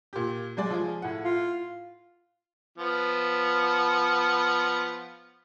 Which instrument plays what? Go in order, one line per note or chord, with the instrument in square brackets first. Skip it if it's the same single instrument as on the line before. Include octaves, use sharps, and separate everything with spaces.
[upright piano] A#2 G4
F#3 G#3 D5
F3 F4 G#4
A2 F#5
[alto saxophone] F4
[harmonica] F3 B3